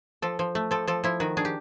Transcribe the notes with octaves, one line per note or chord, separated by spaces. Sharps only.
F3 A4
F3
A3
F3 A4
F3 A4
F3 E4
D#3 F#4
D4 G#4
G4